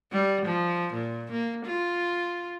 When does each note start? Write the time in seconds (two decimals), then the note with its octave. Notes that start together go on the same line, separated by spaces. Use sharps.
0.13 G3
0.46 F3
0.94 A#2
1.32 A#3
1.66 F4